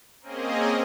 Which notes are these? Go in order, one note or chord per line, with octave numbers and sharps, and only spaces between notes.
A#3 C4 C#4 G#4 D#5